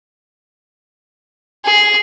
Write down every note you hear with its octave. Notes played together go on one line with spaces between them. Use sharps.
G#4